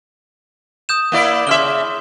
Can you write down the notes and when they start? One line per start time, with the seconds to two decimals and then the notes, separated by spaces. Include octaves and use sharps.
0.89 D#6 G6 E7
1.12 A#3 E4 D5
1.47 C#3 E5 C6 F6 G7